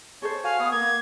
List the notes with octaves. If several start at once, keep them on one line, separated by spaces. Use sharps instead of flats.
G#4 A4 C5 C#5
F#4 F5 G#5
B3 F#5 D#6
A#3 G#6